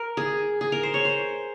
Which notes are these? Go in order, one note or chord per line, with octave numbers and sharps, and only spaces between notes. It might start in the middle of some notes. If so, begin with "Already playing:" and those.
Already playing: A#4
G#4
G#4
A#4
C5
C#5
C5